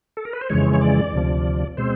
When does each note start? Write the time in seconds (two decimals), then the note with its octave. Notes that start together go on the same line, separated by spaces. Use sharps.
0.17 A4
0.25 A#4
0.33 B4
0.41 C5
0.50 F2 C#3 E3 G#3 C#5
0.73 C#5
0.81 D5
1.13 D2 C3 F3
1.77 B2 G#3 C4 C5